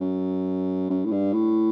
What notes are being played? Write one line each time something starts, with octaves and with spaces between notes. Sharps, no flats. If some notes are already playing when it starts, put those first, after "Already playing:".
F#2
F#2
A2
G2
A2